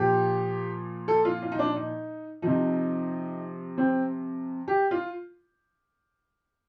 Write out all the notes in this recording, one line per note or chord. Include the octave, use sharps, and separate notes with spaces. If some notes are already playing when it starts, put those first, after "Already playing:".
Already playing: A#2 F3 G4
A4
F4
F4
D#4
D4
D#4
C3 F3 D#4
C4
G4
F4